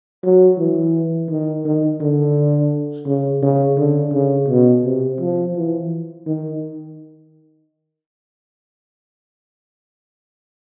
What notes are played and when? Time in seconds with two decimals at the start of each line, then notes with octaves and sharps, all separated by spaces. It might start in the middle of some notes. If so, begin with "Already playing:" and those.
0.23 F#3
0.58 E3
1.29 D#3
1.65 D#3
2.00 D3
3.07 C#3
3.43 C#3
3.78 D3
4.13 C#3
4.48 B2
4.85 C3
5.20 F3
5.56 E3
6.26 D#3